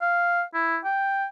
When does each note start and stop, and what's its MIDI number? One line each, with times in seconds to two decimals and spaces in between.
0.02 0.43 77
0.54 0.78 64
0.84 1.26 79